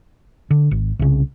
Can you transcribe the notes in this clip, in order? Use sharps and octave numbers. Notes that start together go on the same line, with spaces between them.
D3
G#1
C2 C#3